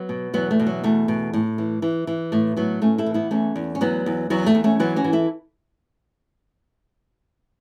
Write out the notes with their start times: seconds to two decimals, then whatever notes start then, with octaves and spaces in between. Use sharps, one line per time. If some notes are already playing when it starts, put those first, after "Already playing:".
Already playing: F#3 B3
0.09 B2
0.34 E2 F#3 B3
0.51 A3
0.60 B2
0.67 F#3
0.84 E2 A3
1.08 B2
1.33 A2
1.58 E3
1.82 E3
2.07 E3
2.32 A2 A3
2.57 A2 F#3 B3
2.81 A2 A3 C#4
2.98 E4 A4
3.06 E3
3.14 B3 E4
3.31 E2 A3 C#4
3.56 E2
3.75 C#4
3.81 E2 F#3 B3
4.06 E2
4.30 E2 F#3 B3
4.46 A3
4.55 E2
4.64 A3 C#4
4.80 E3 F#3 B3
4.96 C#4 F#4
5.04 E3
5.13 E4 A4